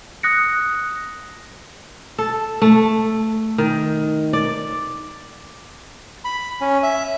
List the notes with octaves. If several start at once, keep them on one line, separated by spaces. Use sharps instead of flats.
D#6 F#6 A#6 C#7
A4
A3
D#3
D5
B5
C#4
E5